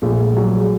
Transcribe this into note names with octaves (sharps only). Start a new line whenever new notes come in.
A#1 A3
G#3
F#3 G3
G#3